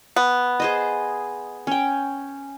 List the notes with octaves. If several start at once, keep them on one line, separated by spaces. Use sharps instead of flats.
B3
G#4 C5 D#5
C#4 G5